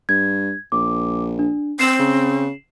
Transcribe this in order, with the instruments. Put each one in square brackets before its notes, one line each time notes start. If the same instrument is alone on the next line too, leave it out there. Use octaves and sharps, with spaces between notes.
[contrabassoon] G2 [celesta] G#6
[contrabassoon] A#1 [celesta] D6
[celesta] D4
[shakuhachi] C4 [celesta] C7 E7 F#7
[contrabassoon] C#3